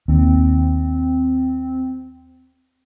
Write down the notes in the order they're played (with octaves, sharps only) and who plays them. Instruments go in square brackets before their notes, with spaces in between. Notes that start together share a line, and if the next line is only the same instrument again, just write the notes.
[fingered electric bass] D#2 [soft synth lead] C4